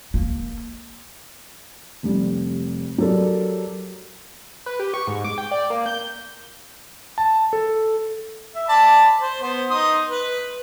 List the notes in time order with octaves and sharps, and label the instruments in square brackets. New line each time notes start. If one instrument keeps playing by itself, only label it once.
[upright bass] A#3
[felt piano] F1 G3
F#3 G4 A4 A#4 D5
[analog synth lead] B4
G4
C#6
G#2
D6
G5
D5
A#3
G6
[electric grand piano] A5
A4
[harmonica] E5
D5 A5 B5
C5
B3 C5
D#4 C6 D#6
B4